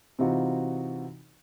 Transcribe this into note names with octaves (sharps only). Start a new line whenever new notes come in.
C3 E3 C4 D#4 F4 F#4